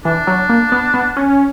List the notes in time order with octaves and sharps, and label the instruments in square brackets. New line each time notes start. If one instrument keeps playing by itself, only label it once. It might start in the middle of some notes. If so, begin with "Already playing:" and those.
[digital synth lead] E3 [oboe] D4
[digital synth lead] F#3
A#3
B3
B3
C#4